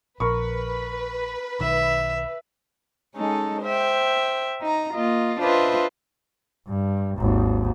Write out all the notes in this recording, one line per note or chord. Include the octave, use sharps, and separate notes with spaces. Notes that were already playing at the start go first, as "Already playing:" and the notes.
A#1 A#4 B4 B5 C#6
B1 D#3 E5
G#3 C#4 D#4 A4
C5 E5 G5
D#4 A#5
A#3 F4 D#5
D4 F4 B4 C5 D#5 E5
G2
G#1 D#2